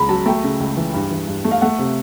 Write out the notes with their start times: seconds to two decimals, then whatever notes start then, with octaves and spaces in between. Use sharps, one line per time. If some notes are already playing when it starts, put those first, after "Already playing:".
Already playing: C#2 C#3 A#5 B5
0.09 F#3 A5
0.26 A3 G5
0.43 C#3
0.60 C#2
0.77 E3
0.94 G2
1.11 E3
1.27 G2
1.44 A3
1.51 F5
1.61 A3 F#5
1.79 C3